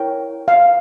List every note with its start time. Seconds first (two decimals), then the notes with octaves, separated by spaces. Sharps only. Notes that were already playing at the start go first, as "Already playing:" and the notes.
Already playing: E4 A#4 C#5 G5
0.48 F5